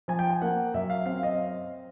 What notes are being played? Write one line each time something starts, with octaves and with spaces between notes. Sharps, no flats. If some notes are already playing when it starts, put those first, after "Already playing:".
F3 G#5
G5
G#5
A#3 F#5
F#2 E5
F5
C4 F5
D#5